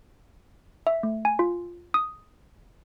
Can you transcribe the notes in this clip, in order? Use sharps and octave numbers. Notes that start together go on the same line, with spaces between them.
E5
A3
G#5
F4
D#6